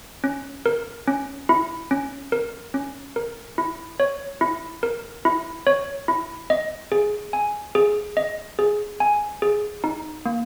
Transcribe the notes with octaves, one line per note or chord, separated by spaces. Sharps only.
C#4
A#4
C#4
E4
C#4
A#4
C#4
A#4
E4
C#5
E4
A#4
E4
C#5
E4
D#5
G#4
G#5
G#4
D#5
G#4
G#5
G#4
D#4
A#3